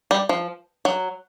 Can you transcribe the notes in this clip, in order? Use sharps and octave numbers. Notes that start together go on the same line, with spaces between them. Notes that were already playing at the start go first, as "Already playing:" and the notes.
G3
F3
F#3